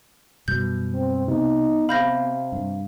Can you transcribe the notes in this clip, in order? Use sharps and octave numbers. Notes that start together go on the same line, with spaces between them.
F#2 B2 G3 G6
C4
C3 B3 D#4
C3 F5 B5 G6 A#6
G2